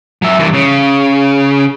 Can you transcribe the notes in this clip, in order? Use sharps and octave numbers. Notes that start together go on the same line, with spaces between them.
F#3 E5
G2 E3
C#3